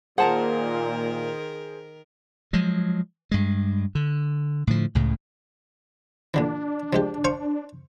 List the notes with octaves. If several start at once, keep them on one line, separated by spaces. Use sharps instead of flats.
A#2 D#3 G#4 A#4 C5 F#5 A5 A#5
F3 F#3 G#3
G2 G#3
D3
A2 D3 F3
C#2 A2 C#3
A#2 D3 E3 D4
F3 G#3 G4
C5 F5 C#6